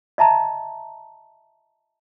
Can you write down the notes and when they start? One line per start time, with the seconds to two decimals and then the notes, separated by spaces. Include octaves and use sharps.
0.18 D#5 E5 A5 A#5